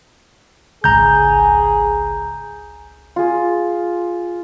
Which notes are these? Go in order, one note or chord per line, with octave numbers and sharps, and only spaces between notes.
G#1 C#2 G#4 A#5 G6
F4 G#4